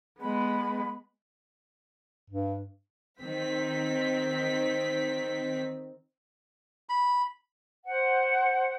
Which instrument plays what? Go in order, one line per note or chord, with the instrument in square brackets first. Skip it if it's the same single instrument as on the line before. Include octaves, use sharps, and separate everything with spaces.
[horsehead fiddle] G#3 B3 [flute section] B5
[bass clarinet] G2
[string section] D#3 C4 B6
[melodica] B5
[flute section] C5 F#5